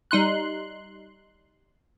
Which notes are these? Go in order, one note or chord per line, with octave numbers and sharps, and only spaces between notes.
G3 D#4 C6 F#6